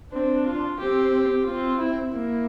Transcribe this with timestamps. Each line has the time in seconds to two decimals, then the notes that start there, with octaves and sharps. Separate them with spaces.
0.13 C4 D4
0.46 F4
0.79 C4 G4
1.46 C4 F4
1.79 E4
2.12 A#3 E4